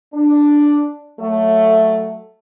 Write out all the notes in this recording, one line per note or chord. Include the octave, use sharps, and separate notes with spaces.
D4
F#3 A3